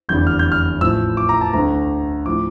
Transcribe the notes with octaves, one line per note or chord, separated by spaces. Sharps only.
F1 E2 D3 G3 G6
F6
G6
F6
A1 A2 F3 E6
D6
A#5
A5
D2 D3 A3 A#5
A2 F3 D6